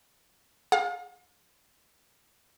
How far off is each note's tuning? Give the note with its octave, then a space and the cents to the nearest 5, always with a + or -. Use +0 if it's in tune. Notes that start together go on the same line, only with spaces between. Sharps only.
G#4 +5 F5 +45